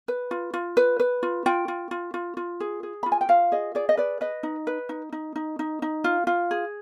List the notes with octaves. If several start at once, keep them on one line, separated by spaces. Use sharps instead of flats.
B4
F4
F4
B4
B4
F4
F4 G5
F4
F4
F4
F4
G#4
G#4
F4 B5
G#5
G5
F4 F5
G#4 D#5
G#4 D5
D#5
B4 D5
B4 D#5
D#4
B4
D#4
D#4
D#4
D#4
D#4
F4
F4
G#4